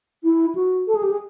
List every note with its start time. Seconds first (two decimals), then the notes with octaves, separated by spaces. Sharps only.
0.24 E4
0.55 F#4
0.87 A4
0.95 G#4
1.03 G4
1.11 G#4